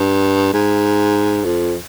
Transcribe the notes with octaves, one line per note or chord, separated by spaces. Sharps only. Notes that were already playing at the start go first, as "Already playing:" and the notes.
Already playing: G2
G#2
F2